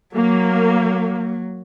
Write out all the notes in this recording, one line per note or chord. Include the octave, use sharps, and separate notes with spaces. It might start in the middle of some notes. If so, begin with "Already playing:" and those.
F#3 A#3